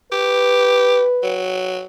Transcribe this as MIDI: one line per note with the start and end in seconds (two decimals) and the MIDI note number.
0.12 1.04 67
0.12 1.46 71
1.23 1.85 54